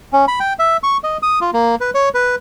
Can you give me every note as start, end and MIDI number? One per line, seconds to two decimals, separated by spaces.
0.13 0.26 61
0.28 0.39 83
0.40 0.53 79
0.59 0.77 76
0.83 0.97 85
1.04 1.17 75
1.23 1.39 87
1.41 1.51 65
1.53 1.75 58
1.80 1.90 71
1.95 2.09 73
2.14 2.35 71